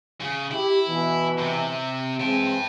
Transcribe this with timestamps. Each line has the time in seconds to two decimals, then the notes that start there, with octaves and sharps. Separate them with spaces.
0.21 C#3
0.51 E4 G4
0.87 B2 E3
1.39 C3
2.20 E3 G#3 C4 G5 A5